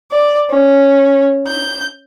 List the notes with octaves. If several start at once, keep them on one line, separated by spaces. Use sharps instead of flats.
D5
C#4
G6